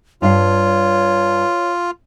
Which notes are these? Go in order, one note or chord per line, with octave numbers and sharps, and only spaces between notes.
G2 F4 C#5 F5